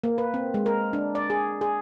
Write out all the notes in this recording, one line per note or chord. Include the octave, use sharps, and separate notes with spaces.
A#3
B4
C4
G#3
A#4
D4
D5
G#4
G#4